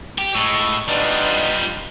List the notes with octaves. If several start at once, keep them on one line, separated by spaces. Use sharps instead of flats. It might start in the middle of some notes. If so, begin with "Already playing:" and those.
G4
A2 D#5 C#6 E6
G3 B3 D4 D#4 F4